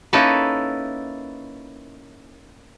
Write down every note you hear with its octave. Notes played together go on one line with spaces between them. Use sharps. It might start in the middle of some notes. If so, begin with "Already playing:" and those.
A#3 C#4 D#4 E4 A4 B4